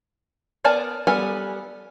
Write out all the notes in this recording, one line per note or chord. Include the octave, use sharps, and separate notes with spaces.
B3 A#4 D5 G#5 A5
G3 B3 A4 A#4 G#5